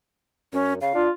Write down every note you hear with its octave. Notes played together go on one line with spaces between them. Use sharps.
F#2 C#4
C#3 F5
D4 F4